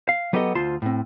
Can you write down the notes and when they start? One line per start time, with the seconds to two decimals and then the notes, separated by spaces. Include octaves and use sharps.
0.09 F5
0.33 F#3 B3 G4 A4 C5 D#5
0.55 D2 F4 C5 A5 C6
0.82 A2 C4